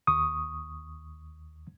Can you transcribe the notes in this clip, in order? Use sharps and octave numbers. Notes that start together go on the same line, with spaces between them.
D#2 C#6 D#6